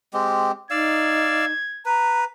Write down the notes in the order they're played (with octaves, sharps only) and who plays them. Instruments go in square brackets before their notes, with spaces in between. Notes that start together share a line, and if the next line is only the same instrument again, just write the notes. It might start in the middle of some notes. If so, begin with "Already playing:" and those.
[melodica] G#3 C4 G4
[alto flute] D#4 [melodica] D5 F5 E6 [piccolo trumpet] G#6
[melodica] B4 [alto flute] A#5